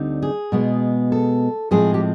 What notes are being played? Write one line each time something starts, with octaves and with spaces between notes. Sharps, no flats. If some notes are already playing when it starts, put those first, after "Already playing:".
Already playing: D2 D3 G3 C4 D#4
G#4
B2 G#3 B3
A4
A2 F3 G#3 C4 G#4
G4